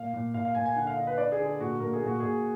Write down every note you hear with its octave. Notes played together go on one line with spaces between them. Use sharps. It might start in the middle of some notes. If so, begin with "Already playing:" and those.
Already playing: A#2 F5
A#2
A#2 F5
F5
A#2 G#5
G#5
D3 F#5
F5
D3 D#5
B4
D3 D5
G#4
D3
G#4
A#2 F#4
A#2 A#4
G#4
A#2 F#4
A#2 G#4